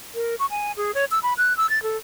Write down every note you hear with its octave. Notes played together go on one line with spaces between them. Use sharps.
A#4
C#6
G#5
G#4
C#5
E6
B5
F#6
E6
A6
A4